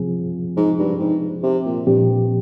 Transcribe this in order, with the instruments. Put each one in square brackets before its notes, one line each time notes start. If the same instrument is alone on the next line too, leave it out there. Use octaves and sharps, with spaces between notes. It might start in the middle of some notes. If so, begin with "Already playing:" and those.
Already playing: [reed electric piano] C3 F3 C4 F4 G#4
[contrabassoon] G#2
G2
G#2
C3
A#2
[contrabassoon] G2 [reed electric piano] A#2 F3 C4 G4